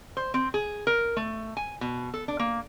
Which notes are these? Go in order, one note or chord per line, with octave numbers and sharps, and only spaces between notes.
C5
C4
G#4
A#4
A3
G#5
B2
A4
D4
A#3